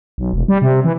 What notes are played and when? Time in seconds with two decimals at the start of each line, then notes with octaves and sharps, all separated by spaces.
0.18 B1
0.33 E1
0.48 G3
0.62 C3
0.85 E3